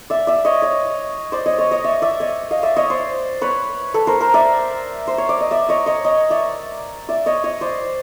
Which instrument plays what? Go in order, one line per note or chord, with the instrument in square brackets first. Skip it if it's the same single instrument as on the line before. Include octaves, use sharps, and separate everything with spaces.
[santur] D5 E5
D5 E5
C#5 D#5
C#5 D#5
C5 D5
C#5 D#5
C#5 D#5
C#5 D#5
D5 E5
D5 E5
C#5 D#5
D#5 F5
D5 E5
C#5 D#5
C5 D5
B4 C#5
A4 B4
A#4 C5
A#4 C5
D5 E5
C5
C#5
D5
D#5
D5 E5
C#5 D#5
C#5 D#5
C#5 D#5
D5 E5
D5 E5
C#5 D#5
C#5 D#5
C5 D5